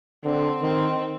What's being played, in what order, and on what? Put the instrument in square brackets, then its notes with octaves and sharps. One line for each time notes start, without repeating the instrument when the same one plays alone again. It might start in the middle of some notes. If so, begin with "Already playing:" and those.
[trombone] D3 [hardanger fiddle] C4
[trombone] D#3 [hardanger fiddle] C4